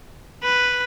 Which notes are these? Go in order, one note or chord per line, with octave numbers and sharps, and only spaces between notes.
B4